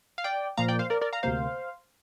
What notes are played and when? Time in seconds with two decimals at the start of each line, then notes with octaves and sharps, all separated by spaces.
0.18 F5
0.24 D5 G5
0.57 A#2 F3 A#3 F5 A#5
0.68 D5 G5
0.79 C5 F5
0.90 A#4 D5
1.01 A#4 D5
1.13 F5 A#5
1.23 D2 C3 A#3 C5 F5